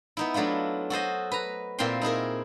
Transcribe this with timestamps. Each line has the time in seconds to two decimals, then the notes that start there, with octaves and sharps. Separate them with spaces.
0.17 B3 D#4 E4
0.34 F#3 A3 D4 E4 F4
0.90 F#4 A4 C5 D#5
1.32 B4 A#5
1.79 A#2 C4 E4 F5 G5 C6
2.01 D#4 E4 G#4 A#4